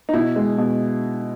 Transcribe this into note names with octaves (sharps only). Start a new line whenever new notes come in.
D#4
B2 E4
G#3
B2